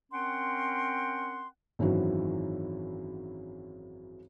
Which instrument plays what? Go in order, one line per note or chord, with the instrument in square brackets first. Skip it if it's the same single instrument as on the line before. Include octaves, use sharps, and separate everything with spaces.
[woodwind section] C4 C#4 A#4 F#5 G5 C6
[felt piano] G#1 F#2 D#3 E3 F#3